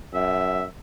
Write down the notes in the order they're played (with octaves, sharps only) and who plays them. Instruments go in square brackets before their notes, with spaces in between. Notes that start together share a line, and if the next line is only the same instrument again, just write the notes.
[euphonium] F#2 [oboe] E5